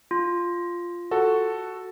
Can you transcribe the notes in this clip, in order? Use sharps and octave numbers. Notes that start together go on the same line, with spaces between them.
F4
F#4 A4